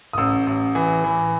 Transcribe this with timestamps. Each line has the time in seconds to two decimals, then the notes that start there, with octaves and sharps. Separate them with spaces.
0.13 D#6
0.18 A1 E6
0.47 A1
0.75 E3
1.04 E3